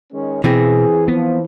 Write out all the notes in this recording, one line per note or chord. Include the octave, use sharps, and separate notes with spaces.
D#3 G#3 C#4
B2 E3 C4 G#4
F3 B3